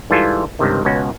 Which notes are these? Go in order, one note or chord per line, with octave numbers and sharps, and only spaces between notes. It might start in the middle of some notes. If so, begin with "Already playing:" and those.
G#2 E3 G3 F4 A4 G#5
C#2 G2 C3 D#3
C#2 B2 C#4 F#4